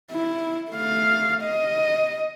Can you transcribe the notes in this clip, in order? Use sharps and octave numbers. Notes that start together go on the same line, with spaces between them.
E4
A3 F5
D#5